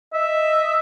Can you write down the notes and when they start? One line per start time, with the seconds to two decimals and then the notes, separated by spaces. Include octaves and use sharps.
0.13 D#5 E5